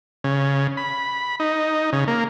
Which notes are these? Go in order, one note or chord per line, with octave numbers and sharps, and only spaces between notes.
C#3
B5
D#4
C#3
A#3